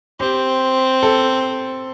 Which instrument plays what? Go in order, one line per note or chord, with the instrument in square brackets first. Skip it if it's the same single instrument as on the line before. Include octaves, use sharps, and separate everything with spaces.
[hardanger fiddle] C4 [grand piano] G4
[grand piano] A4